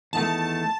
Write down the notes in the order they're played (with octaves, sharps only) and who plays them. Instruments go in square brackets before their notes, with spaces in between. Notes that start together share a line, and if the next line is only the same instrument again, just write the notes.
[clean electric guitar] E2 D#3 A3 [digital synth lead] A5